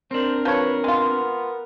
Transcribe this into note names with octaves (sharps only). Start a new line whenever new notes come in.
C4 D4 A#4 C5
F3 B4 C#5
G#3 B3 F4